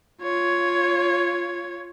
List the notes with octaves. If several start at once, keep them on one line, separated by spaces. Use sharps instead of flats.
F4 C#5